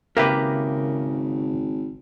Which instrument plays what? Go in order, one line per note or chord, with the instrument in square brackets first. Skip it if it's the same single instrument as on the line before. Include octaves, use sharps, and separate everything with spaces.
[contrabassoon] G#1 [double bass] C#3 [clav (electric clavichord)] A#3 G4 B4 [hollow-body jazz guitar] A#4 E5